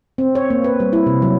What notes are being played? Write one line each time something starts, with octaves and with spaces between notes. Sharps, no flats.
C4
C#5
A#3
B4
G3
E4
C3
F#3